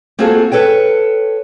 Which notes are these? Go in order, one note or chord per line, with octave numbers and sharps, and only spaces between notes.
A#3 C4 F4 F#4 G#4 A4
A4 B4 C#5 G5